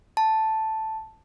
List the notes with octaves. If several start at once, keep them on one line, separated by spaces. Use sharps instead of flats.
A5